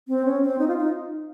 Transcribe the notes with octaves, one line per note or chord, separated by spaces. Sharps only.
C4
C#4
C4
D#4
F4
D#4